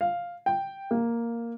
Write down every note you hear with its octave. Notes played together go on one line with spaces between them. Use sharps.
F5
G5
A#3